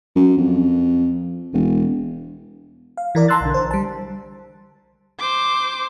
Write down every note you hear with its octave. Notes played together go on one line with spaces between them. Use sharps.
F#2
F2
E1
F5
E3 A#4 D5
A5 A#5 C6 E6 F#6 A6
B1 D3
C5
G3 A5
C5 D6